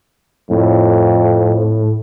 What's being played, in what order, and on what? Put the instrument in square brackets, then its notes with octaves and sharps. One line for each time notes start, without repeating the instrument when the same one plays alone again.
[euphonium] F2 [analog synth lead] A2